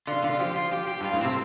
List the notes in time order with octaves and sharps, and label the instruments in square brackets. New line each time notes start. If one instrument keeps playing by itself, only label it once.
[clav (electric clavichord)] D3 [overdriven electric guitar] F4
[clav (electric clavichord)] D3 [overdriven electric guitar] F4
[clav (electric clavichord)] F3 [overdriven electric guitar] G4
[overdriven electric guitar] F4
G4
G4
[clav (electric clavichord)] G2 [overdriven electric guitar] F4
[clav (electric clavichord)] A2
[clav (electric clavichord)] C3 [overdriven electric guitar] C4